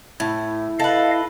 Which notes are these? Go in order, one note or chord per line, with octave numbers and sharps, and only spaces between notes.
A2 E4
A4 B4 D#5 F5